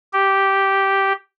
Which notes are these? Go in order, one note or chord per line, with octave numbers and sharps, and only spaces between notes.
G4